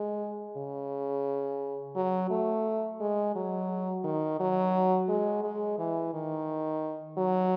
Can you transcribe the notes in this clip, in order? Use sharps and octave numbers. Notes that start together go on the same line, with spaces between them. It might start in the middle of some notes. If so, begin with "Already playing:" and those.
Already playing: G#3
C#3
F#3
A3
G#3
F#3
D#3
F#3
G#3
G#3
E3
D#3
F#3